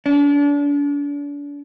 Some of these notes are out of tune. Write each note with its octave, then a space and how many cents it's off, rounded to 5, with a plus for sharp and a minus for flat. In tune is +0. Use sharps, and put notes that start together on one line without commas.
D4 -35